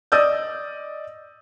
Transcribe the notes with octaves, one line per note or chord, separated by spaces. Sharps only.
D5 D#5 D#6 E6 G6